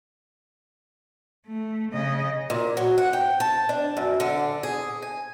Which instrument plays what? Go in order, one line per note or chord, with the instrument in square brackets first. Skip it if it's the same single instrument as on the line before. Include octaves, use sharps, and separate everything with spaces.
[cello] A3
C#3 D#5
[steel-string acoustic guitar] A#2
F#3
F#5
G5
A5
D4
F#2
D3
G#4
G#5